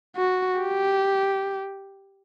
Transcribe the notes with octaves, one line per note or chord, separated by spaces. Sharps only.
F#4
G4